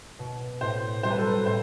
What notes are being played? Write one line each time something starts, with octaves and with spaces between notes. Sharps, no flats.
B2
A2 C5
G3 C5
B4
A4
B4
A2 C5